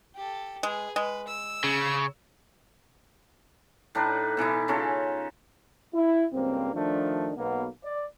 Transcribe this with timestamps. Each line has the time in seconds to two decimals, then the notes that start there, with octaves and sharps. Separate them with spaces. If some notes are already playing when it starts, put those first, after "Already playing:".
0.15 G4 A4
0.63 G#3 G#4 B4
0.96 G#3 B4
1.27 E6
1.64 C#3
3.95 A2 D4 D#4 B4
4.37 B2 E3 D#4 E4
4.68 C#3 C#4 F4 A4
5.94 E4
6.33 C#2 G2 A#3 C4
6.74 D#3 F3 A3 D4
7.37 B1 B2 A#3 B3
7.84 D5